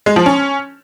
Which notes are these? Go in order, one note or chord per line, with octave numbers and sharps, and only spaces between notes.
G#3
F3
C#4